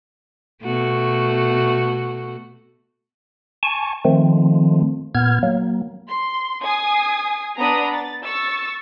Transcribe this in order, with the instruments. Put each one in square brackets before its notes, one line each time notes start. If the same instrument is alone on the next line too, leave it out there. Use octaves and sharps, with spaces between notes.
[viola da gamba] B2 A3 F#4
[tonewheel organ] G#5 A5 C#6
D#3 F3 A3 C4
A#2 B3 F6 G#6
F#3 A#3
[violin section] C6
G#5 D#6 G#6 C7
B3 D4 A#5 B5 D#6
A6
C#6 E6 A6